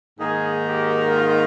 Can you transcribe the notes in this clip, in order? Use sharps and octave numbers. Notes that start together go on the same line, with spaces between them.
G#2 D#3 A#3 D#4 G#4
G4
F4